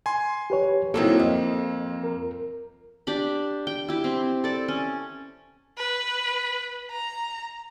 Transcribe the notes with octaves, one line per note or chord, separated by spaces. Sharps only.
G#5 C6
G4 B4 C#5
D#3 F#3 A#3 C4 E4 A4 C#5
F2 D#5
A#4
D4 G4 B5
G5
E4 G4
C4
A4 D5
C#4
B4
A#5